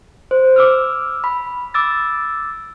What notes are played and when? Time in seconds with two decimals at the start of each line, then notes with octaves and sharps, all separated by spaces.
0.31 C5
0.56 D6 E6 F6
1.24 B5
1.74 D6 E6 A6